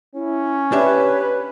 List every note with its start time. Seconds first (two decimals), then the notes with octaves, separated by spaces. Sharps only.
0.15 C#4 E4
0.72 D4 G4 B4 C#5 E5